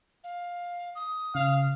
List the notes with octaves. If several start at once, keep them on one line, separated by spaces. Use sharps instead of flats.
F5
D#6
C#3 F5